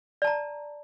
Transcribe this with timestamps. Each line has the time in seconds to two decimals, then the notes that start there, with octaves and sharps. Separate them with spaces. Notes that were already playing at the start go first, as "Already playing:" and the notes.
0.22 D5
0.24 A5
0.27 A#5